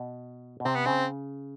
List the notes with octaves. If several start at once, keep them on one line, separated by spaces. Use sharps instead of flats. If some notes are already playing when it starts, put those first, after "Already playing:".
Already playing: B2
B2
C3 C4
B3
C#3 C4